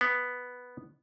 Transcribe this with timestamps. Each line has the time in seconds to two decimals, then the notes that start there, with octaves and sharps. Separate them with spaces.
0.01 B3